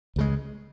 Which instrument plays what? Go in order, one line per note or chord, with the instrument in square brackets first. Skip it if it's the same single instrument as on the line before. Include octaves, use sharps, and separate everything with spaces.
[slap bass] C#2 C#3 G#3